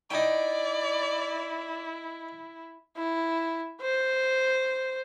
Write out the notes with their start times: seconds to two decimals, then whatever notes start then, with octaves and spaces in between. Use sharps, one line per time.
0.10 D#4 E4 D5 G5
2.97 E4
3.81 C5